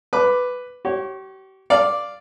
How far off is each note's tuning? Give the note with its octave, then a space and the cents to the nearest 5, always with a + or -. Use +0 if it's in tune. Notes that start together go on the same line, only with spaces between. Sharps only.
B4 +5 D6 +0
G4 -40 C#5 -20
D5 +0 F5 +0